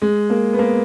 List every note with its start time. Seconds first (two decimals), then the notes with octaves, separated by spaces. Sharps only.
0.02 G#3
0.30 A#3
0.53 B3
0.59 A#3